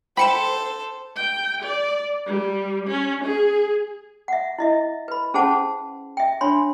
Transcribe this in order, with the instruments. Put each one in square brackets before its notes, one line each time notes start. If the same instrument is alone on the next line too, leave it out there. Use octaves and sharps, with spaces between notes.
[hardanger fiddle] A4 [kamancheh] C5 [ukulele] G5 [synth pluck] B5 C#7 E7
[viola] G5
D5
G3
C#4
G#4
[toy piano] E5 F#5
E4 D#5 E5
B4 B5
C#4 G#4 C5 F#5 A5
E5 G5
D4 C#5 B5 C6